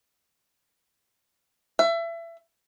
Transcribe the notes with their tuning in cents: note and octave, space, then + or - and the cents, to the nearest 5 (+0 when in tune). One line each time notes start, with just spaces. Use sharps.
E5 +25